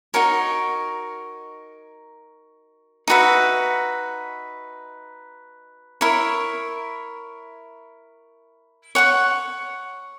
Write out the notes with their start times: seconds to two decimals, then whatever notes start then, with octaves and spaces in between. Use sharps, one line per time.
0.14 D#4 F#4 A#4 C#5
3.08 D#4 F#4 B4 E5
6.01 E4 A#4 C#5
8.95 C#5 F#5 C#6